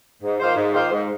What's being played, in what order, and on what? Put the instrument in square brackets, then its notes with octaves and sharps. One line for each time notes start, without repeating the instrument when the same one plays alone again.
[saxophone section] G#2
D#3 A#3 F4 C5
G#2
D#3 A#3 F4 C5
G#2